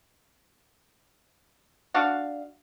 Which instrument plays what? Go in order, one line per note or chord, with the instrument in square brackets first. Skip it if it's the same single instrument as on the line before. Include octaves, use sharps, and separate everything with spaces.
[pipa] D4 F#4 F5